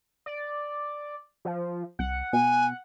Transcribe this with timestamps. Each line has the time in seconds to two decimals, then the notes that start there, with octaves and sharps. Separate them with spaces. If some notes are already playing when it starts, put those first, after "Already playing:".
0.26 D5
1.45 F3
1.99 C2 F#5
2.33 B2 G#5